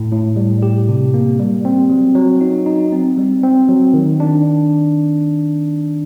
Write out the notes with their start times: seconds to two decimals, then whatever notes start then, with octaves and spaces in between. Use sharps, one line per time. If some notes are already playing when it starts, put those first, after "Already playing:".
Already playing: A2
0.12 A2
0.36 G3
0.63 G4
0.89 C3
1.14 A#3
1.39 G3
1.65 C4
1.90 F#3
2.15 F#3
2.41 D#4
2.66 D#4
2.93 C4
3.17 G3
3.43 C4
3.69 F#3
3.94 D#3
4.20 D4